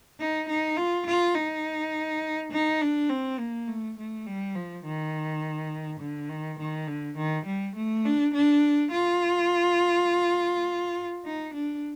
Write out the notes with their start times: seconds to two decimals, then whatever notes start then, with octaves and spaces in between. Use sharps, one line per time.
0.20 D#4
0.49 D#4
0.77 F4
1.06 F4
1.35 D#4
2.52 D#4
2.82 D4
3.10 C4
3.39 A#3
3.68 A3
3.98 A3
4.27 G3
4.55 F3
4.85 D#3
6.01 D3
6.29 D#3
6.59 D#3
6.88 D3
7.17 D#3
7.46 G3
7.76 A3
8.05 D4
8.34 D4
8.91 F4
11.25 D#4
11.54 D4